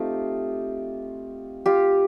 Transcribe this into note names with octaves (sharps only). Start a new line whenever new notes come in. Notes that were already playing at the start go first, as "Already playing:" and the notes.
Already playing: A3 C4 D#4 F4 G4
F4 G4